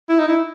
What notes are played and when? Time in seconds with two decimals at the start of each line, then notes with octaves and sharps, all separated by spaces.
0.09 E4
0.19 D#4
0.28 E4